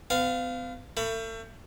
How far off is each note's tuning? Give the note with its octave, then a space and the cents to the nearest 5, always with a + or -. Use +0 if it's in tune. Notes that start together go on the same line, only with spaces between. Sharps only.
B3 +45 F5 +0
A3 +35 B5 +0